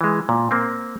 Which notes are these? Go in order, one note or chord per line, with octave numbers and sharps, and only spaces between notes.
E3 G#3
A#2
A#3 C4